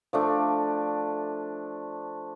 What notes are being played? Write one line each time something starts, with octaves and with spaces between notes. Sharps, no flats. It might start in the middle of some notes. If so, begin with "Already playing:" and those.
F3 A3 D4